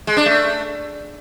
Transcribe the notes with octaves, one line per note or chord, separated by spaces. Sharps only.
G#3
D4
A3